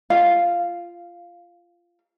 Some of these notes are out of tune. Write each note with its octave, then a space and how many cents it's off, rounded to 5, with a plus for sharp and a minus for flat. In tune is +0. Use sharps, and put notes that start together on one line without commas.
F4 -15 F5 +0